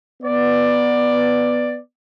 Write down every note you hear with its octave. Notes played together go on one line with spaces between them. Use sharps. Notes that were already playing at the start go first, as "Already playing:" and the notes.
B3 D5